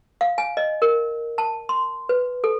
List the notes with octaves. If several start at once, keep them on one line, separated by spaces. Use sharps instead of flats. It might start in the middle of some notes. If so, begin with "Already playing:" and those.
F5
G#5
D#5
A#4
A5
C6
B4
A4